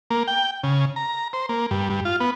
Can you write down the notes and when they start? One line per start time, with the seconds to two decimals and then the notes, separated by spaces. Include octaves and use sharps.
0.11 A#3
0.27 G5
0.63 C#3
0.96 A#5
1.33 C5
1.49 A#3
1.71 G2
1.90 G2
2.05 F4
2.20 B3